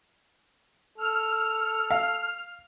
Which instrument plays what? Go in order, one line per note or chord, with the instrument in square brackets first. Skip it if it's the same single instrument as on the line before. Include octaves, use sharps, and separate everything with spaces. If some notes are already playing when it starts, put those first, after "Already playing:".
[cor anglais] A4 [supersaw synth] F6
[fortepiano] F5